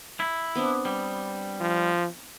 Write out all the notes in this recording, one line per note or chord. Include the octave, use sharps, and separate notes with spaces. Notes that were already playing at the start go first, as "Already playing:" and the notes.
E4
B3 C4 D4
G3
F3